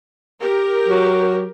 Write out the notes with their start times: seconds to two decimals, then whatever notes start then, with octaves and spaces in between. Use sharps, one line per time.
0.41 G4 A#4
0.89 F#3